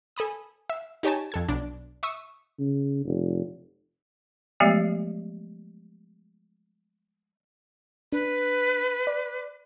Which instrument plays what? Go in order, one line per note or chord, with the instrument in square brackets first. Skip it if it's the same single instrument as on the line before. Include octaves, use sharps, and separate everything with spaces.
[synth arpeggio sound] A4 G#5 B5 D#6
E5
D#4 G4 C#5 G#5 A5
F2 A4 G#6
B1 D4
E5 C#6 D#6 E6
[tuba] C#3
F1
[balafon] F3 F#3 G#3 A3 B3 G4
[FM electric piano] D4 [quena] B4
[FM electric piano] D5